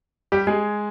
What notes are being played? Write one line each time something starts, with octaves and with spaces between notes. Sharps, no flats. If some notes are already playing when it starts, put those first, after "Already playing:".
G3 G4
G#3 G#4